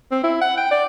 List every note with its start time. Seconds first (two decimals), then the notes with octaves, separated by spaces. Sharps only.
0.12 C4
0.24 E4
0.42 F#5
0.57 G5
0.71 D5